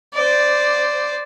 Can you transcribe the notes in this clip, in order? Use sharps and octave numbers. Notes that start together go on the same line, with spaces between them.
C5 D5